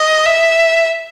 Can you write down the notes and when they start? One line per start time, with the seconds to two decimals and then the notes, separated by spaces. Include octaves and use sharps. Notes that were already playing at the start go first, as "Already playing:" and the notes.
Already playing: D#5
0.26 E5